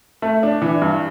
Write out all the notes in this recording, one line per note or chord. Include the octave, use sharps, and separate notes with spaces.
A3
D4
E3
G2